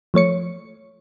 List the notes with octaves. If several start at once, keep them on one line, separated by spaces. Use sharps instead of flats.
F3 A3 C#5 C#7